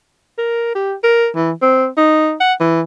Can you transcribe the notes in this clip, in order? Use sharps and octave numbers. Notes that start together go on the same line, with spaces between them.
A#4
G4
A#4
E3
C4
D#4
F#5
E3